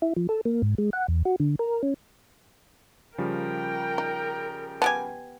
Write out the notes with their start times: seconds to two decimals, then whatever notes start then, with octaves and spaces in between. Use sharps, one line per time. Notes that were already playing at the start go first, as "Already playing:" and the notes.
0.02 E4
0.16 F3
0.29 A4
0.45 A#3
0.62 G#2
0.78 G#3
0.93 F#5
1.08 E2
1.25 F#4
1.40 D3
1.59 A#4
1.83 C#4
3.18 C#3 F3 G3 A#4 G5
3.98 D#4
4.82 B3 G4 G#5 A5